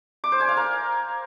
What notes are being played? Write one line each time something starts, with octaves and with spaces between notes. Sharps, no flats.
D6
C5
G#5
F5
A#4